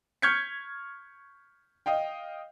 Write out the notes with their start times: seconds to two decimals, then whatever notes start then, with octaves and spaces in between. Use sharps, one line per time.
0.22 C#6 F6 G6 G#6 B6 C#7
1.86 D#5 F5 G5